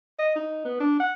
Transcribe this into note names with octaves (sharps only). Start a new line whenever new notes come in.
D#5
D#4
B3
D4
F#5